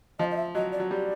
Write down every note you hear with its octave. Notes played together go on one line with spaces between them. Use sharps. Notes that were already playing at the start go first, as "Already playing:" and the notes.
F3 D#5
D#5
E5
F#3 D#5
D5
F#3
G3 D5